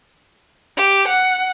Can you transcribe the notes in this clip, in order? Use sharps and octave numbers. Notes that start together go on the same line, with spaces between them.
G4
F#5